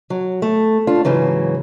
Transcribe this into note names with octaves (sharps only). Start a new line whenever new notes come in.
F#3
A3
D4 F4
G#2 C#3 E3 F#3